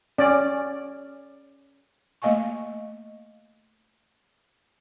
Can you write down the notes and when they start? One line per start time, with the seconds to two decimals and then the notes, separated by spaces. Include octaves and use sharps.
0.18 C#4 D5
2.22 A3 A#3 D#5 F5 G#5 C#6